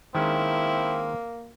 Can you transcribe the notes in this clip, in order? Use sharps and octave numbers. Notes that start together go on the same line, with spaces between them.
D#3 G#3 A#3 C4 C#4 E4